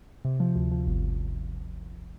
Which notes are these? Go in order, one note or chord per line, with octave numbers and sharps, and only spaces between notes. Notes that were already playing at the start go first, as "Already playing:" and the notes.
C3
F3
D2
F3
G1